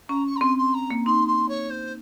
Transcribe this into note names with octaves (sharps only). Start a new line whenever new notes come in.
C#4 A#5
C#6
A#5
C4 C6
C6
A#5
A#3
D#4 C6
C6
C#5
C5